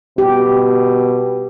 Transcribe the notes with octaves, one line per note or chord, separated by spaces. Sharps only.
B2 G4